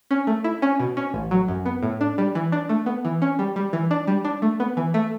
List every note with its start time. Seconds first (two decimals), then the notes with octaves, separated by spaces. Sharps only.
0.11 C#4
0.27 A3
0.44 E4
0.62 C#4
0.80 B2
0.97 C#4
1.14 A1
1.31 F#3
1.48 F#2
1.66 B3
1.83 A2
2.01 D4
2.18 G3
2.35 E3
2.52 D4
2.69 A3
2.86 B3
3.05 E3
3.22 C#4
3.39 G3
3.56 G3
3.73 E3
3.91 D4
4.07 G3
4.25 D4
4.42 A3
4.60 B3
4.77 E3
4.94 A3